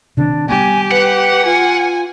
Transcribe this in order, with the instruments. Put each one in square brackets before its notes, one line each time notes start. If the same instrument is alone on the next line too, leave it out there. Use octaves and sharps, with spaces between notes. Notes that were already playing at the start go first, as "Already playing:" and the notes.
[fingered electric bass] C3 D#3 C4 [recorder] D4
[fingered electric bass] G3 A#3 B3 [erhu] G4 [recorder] G#5
[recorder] B4 [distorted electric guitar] F#5
[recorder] F4 [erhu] G#5